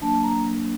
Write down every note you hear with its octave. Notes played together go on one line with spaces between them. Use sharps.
F#3 A#3 D4 A5
A#5